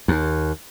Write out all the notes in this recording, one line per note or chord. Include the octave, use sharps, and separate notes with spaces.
D#2